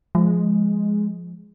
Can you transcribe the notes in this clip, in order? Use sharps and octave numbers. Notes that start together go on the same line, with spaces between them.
F3 G#3